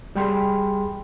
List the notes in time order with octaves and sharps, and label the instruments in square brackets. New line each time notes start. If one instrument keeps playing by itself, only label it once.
[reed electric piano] C2 G3 G#4 G5 B5 C6